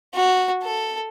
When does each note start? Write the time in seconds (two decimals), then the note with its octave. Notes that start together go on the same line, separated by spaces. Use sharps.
0.14 F#4
0.62 A4